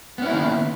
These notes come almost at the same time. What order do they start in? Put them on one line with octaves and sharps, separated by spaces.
B3 C#4 E4 A#3 D#3